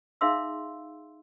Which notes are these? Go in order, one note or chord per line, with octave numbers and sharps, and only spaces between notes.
D#4 G#4 E5 F5 C6 E6